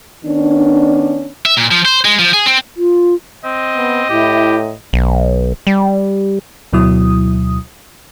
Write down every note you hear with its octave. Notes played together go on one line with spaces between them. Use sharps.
D#3 B3 C#4 D4
E5
A#2
F3
C5
G#3
F3
G#4
C4
F4
C4 D#5
B3
A2 E4 G4
B1
G3
D2 B2 F#3 E4 D#6